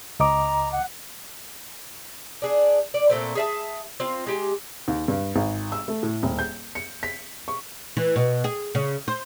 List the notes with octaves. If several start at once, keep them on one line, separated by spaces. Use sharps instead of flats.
C#2 D#5 A#5 D6
F#5
D4 G#4
D5
A#2 A3 C4
G#4 E5 A5
C4 F4
G#3 G4 G#5
D#2
G2
G#1
E6
A3
A2
D#1
G6
C#7
B6
C#6
E3
B2
G#4
C#3
C5